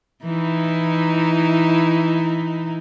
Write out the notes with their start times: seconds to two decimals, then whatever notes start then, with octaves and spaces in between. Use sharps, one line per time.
0.23 E3 D#4 E4